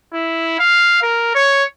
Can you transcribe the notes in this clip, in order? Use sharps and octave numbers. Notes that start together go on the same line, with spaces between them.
E4
F5
A#4
C#5